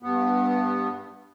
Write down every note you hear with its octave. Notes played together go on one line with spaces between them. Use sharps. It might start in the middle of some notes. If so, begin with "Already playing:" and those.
G2 B3